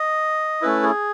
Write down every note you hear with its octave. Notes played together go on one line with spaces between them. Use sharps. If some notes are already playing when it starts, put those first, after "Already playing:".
Already playing: D#5
A3 C#4 E4 B4
G#4